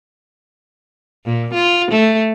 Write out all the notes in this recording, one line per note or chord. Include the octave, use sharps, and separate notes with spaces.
A#2
F4
A3